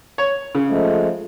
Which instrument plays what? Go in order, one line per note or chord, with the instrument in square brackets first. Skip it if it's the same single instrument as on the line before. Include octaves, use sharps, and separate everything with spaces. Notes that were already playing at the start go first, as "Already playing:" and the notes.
[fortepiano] C#5
C#3
[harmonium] F3 G#3 A3